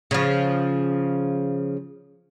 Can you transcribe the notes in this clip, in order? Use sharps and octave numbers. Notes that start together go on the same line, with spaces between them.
C#3 F3